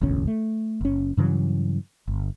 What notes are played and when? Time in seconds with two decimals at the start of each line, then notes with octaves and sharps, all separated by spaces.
0.01 E1 A1 D2 C#4
0.27 A3
0.81 F#1 C#4
1.17 G2 C#3 E3 F#3
2.08 G1